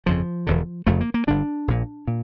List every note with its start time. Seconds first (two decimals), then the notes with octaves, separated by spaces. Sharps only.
0.06 G1 F2 C#3 F3
0.47 E1 E2 D3
0.86 F1 F2 C#3 A3
1.01 A#3
1.14 A#3
1.27 G1 G2 D3 D4
1.68 A#1 A#2
2.07 A#2